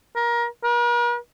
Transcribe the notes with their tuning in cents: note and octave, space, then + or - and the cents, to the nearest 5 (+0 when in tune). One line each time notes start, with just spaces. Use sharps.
A#4 +25
A#4 +45